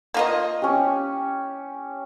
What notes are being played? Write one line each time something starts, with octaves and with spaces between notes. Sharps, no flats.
A#3 F4 D#5
C#4 G4